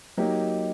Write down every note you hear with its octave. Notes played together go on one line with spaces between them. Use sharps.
F#3 A#3 D#4 G4